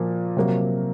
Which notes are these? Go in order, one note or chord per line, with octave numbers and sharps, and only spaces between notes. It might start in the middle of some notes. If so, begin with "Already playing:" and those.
Already playing: A#2 F3 A#3
C3 F#3 A#3